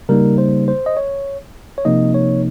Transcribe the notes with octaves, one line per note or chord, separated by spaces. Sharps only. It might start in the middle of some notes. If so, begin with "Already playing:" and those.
C#3 G3 A#3 D#4 A#4
C5
C5
D#5
C#5
C#5
C3 F3 A#3 D#4 D#5
C#5